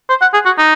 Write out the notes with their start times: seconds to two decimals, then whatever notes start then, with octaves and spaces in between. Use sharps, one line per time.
0.09 C5
0.21 F#5
0.34 G#4
0.46 F#4
0.58 D#4